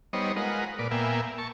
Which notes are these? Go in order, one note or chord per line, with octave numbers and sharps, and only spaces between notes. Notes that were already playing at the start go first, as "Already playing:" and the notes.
G3 B3 D#4 C5 C#5 D#5
G#3 F4 A#4 B4 D#5 F#5
A#2 B4 D5
A#2 A#3 B3 E5 G5 G#5
A5 C#6